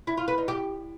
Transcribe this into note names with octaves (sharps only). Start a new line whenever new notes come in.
E4
F4
B4
D#4
G4